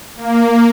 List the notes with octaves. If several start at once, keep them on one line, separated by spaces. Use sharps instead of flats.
A#3